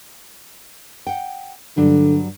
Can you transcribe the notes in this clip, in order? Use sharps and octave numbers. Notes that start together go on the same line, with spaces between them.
F#5 G5
G2 D3 F#3 D4